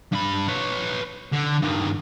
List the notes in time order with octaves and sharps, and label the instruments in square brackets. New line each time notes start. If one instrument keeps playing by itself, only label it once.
[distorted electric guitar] G2 B5
B4 C#5
D3
G2 D#3